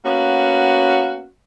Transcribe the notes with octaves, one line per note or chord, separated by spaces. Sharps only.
A#3 B3 C#4 F#4